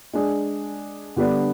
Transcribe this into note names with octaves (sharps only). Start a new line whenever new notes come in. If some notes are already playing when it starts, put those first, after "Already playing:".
G#3 D4 G#4
D3 G3 B3 D4